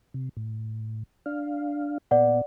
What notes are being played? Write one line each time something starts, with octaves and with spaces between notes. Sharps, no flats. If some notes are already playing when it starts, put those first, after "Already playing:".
C3
A2
D4 F5
A#2 B3 D5 F#5